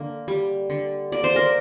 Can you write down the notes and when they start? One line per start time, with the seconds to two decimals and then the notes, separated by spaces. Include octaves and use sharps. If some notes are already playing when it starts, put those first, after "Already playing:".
Already playing: D3 A#3
0.28 G3
0.70 D3
1.12 A#3 D5
1.24 C5
1.36 A#4